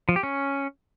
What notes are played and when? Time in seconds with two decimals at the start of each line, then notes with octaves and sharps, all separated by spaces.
0.09 F3
0.16 G4
0.23 C#4